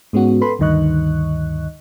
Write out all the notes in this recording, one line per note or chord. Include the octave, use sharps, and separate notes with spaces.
G#2 G#3 B3 C#4 F#4
A4 B4 B5 C6
D2 G2 D#3 D#5 C#6 F#6